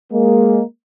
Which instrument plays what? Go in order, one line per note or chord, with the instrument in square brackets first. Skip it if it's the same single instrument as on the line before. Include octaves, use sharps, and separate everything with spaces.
[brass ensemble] G#3 A#3